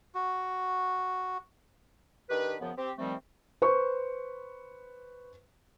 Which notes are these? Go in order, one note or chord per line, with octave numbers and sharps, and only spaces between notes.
F#4
D#3 D4 G4 B4
F#2 C#3 F3 B3
C4 G4
C3 D#3 F3 G3 A3 C4
B4 C5 C#6